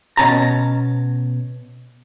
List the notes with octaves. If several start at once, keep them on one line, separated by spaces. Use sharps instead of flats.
B2 C#4 A5 A#5